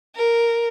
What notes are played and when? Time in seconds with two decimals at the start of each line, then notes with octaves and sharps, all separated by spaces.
0.16 A#4